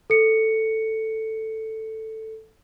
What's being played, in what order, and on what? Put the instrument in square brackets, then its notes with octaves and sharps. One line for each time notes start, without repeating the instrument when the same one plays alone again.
[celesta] A4 C#7